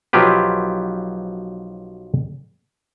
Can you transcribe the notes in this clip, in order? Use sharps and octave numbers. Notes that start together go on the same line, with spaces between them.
B1 F3 F#3 F4 G4 B4